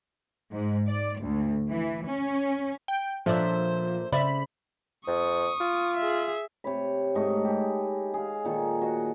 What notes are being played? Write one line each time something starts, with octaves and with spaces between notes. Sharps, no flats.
G#2
D5
D2
E3
C#4
G5
A#2 F3 D4 A4 C5 C#5 E5
C#3 C5 D5 E5 B5
F2 C#6 D#6
F4
G#4 E5
C3 C#5 B5
G#2 A3 D#5 C#6
G4 G#4
G#4 F5
A#2 D#3 G#4 A4
F#4 D#5 F#5